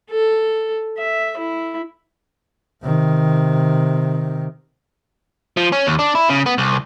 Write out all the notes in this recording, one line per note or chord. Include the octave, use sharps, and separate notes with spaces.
A4
E5
E4
C3 D#3
F3
C#4
D#2
D4
E4
C#3
B3
C2